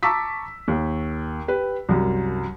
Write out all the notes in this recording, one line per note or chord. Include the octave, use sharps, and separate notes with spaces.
A5 A#5 C#6 D6 E6 B6
D#2
G4 B4
C2 F#2